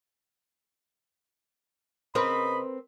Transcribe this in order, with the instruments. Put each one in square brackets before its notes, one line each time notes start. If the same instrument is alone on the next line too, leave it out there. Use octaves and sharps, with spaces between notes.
[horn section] C#3 D#5 B5 [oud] C4 A#4 B4